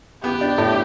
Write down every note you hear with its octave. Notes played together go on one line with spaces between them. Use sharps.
B3 G4
D4
A2